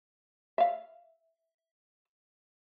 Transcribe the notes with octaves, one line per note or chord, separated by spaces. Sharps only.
E5 F5